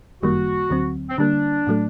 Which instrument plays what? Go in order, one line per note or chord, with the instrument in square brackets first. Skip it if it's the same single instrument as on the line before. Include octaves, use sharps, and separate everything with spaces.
[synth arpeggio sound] G1 F#2 D#3 G3 A#3 [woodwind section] F#4
[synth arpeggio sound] D2 D3 F#3 C4
[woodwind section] C4
[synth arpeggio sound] D3 G3 A#3 [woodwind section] D4
[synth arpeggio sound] A2 F#3 A3